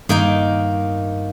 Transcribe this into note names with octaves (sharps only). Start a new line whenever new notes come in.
G2 D#3 A#3 D#4